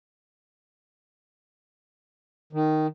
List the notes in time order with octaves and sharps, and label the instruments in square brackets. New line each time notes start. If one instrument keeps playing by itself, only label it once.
[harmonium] D#3